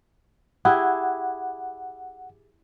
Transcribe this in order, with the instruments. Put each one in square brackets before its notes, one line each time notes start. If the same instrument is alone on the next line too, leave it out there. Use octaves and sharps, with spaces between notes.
[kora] E4 G4 G#4 [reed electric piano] F#5